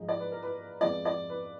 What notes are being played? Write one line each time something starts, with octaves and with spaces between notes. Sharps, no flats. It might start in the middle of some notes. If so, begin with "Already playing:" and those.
Already playing: G#2 F3 G#3 D#4
D5
B4
A#4
B4
F2 F3 G#3 B3 D5
D5
B4